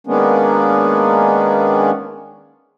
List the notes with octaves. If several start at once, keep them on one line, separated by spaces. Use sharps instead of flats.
D#3 G#3 A#3 B3 C#4 D4